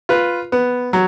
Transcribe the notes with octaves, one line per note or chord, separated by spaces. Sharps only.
F4 B4
B3
F#3